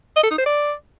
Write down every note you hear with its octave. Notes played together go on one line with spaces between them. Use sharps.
D#5
A4
D#4
C5
D5